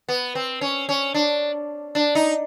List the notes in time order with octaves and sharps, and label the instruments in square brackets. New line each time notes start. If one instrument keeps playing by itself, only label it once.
[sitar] B3
C4
C#4
C#4
D4
D4
D#4